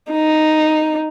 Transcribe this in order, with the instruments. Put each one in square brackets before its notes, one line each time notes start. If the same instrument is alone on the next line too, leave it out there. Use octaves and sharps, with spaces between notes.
[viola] D#4